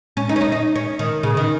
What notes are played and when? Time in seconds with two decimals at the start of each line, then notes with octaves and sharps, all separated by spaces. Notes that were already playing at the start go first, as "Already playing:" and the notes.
0.17 C#4
0.29 D#4
0.36 C#4
0.41 D#4
0.52 D#4
0.75 C#4
0.99 D#3
1.23 C#3
1.37 D#3